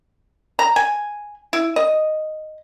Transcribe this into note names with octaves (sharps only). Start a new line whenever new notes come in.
A#5
G#5
E4
D#5